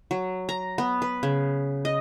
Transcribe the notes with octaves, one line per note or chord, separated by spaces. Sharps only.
F#3
A#5
B3
B4
C#3
D#5